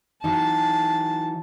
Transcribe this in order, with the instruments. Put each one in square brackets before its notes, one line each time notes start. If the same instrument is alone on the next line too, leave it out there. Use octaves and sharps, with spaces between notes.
[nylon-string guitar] E3 F#3 D#4 [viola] A5